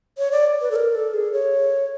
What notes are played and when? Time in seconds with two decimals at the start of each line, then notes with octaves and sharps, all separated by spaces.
0.18 C#5
0.32 D5
0.61 B4
0.71 A4
0.76 A#4
0.95 A4
1.14 G#4
1.33 C#5